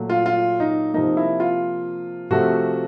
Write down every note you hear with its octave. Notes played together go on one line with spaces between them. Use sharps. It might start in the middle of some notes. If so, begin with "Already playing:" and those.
Already playing: A#2 F#3 A3
F4
F4
D#4
C3 F3 A#3 D#4
E4
F4
C3 F3 A3 F#4